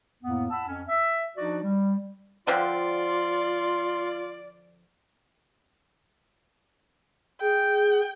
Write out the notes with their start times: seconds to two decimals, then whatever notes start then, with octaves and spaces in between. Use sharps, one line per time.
0.23 F2 A2 A#3 B3
0.51 F#5 A5 B5 E6
0.67 F2 C#4
0.88 E5
1.37 F3 D4 D#4 F#4 D5
1.63 G3
2.47 D3 F3 C4 F4 D5 C6
7.41 G#4 G5